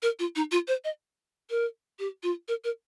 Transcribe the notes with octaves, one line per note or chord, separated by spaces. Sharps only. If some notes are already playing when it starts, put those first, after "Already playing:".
A#4
F4
D#4
F4
C5
D#5
A#4
G4
F4
A#4
A#4